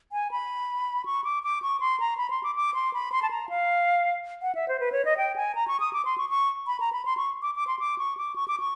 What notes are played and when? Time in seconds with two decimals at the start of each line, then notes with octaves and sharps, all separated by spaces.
0.12 G#5
0.31 B5
1.06 C#6
1.24 D6
1.43 D6
1.62 C#6
1.80 C6
2.00 A#5
2.17 B5
2.30 C6
2.43 D6
2.55 D6
2.74 C6
2.94 B5
3.12 C6
3.22 A5
3.31 A#5
3.49 F5
4.42 F#5
4.55 E5
4.68 C5
4.80 B4
4.92 C#5
5.05 D#5
5.17 G5
5.36 G#5
5.55 A#5
5.68 C#6
5.80 D#6
5.93 D6
6.05 C6
6.18 C#6
6.29 C#6
6.67 B5
6.80 A#5
6.93 B5
7.05 C6
7.17 C#6
7.42 D6
7.55 D6
7.67 C6
7.79 D6
7.98 C#6
8.17 D6
8.36 C#6
8.48 D6
8.60 C#6